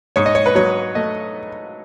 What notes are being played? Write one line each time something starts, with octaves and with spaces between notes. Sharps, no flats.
G#2 C#5
D#5
C#5
B4
F#3 C#5
A3 D#5